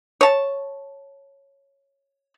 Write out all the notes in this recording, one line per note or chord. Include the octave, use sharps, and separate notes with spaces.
C#5 A5